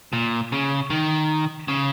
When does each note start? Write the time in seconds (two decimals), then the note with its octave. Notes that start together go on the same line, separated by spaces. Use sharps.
0.13 A#2
0.52 C#3
0.90 D#3
1.68 C#3